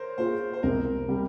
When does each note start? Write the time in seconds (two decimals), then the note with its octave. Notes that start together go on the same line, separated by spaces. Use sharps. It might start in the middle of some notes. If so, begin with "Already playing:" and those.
Already playing: A#4 C5 C#5
0.18 A#3 F4 G#4 C5
0.53 C5
0.63 C2 A#4
1.08 C3 G3